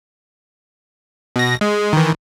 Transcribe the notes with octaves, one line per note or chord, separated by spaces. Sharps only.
B2 A#6
G#3
D#3 E3